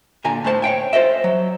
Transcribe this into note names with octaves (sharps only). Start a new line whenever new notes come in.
A#2 D3 G#5 A#5
A2 A3 C5 A5
C#5 F5 G5 G#5
F4 C5 D#5 E5
F#3